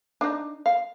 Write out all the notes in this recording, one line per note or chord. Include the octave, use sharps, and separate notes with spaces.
D4 D#4
F5